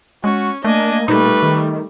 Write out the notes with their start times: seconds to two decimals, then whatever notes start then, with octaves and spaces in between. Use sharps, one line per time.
0.24 G#3 C#4 F#4
0.65 A3 A#3 D4 D#5 G#5
1.08 A#2 G3 A3 D#4 B4
1.42 D#3